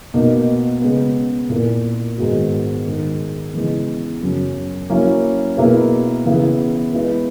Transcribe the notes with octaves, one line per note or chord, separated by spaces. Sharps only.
B2 A#3 D#4
C#3 G#3 B3
A#2 A#3 E4 A#4
G#2 D#3 G#3 B3 F#4
D#3 G#3 D#4 G#4
C#3 E3 G#3 B3
F#2 C#3 F#3 C#4
F#3 A#3 C#4 E4 A#4
B2 A#3 E4 G#4 B4
C#3 E3 B3 E4 G#4
G#3 B3 E4 B4